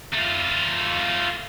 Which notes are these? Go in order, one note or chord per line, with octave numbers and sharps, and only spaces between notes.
A3 F4